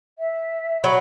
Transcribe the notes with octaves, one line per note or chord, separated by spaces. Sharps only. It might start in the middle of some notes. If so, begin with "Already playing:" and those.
E5
F#3 F#5 B5 C#6